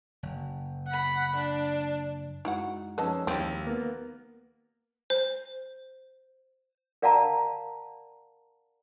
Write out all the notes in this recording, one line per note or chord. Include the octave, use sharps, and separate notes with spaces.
F#1
F#5 B5
D4
F#2 G#3 D#4 E4 F#4 F#5
F3 G#3 C#4 D#4 B4 D#5 A5 E6
D#2 C4 E4
A#3 B3
C5
A#4 D5 F5 F#5 A5 A#5